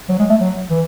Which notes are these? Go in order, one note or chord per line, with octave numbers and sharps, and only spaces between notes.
F#3
G#3
A3
F#3
E3